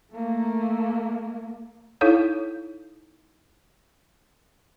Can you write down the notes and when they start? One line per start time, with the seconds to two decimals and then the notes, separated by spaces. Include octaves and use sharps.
0.12 A3 A#3
2.01 D#4 E4 A4 C#5 F5 G6